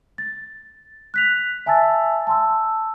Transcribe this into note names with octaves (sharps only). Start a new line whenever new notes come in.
A6
F#6 B6 F7
E5 G#5 A5 E6 A6
A5 C6 E6